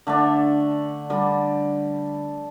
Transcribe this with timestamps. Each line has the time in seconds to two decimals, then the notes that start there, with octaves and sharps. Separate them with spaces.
0.07 D3 A3 D4
1.10 D3 G3